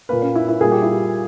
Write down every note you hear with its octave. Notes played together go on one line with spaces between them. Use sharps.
A#2 A#3 B4
C#4
E4
E4
A#2 G3 A#3 G#4
G4
E4
G4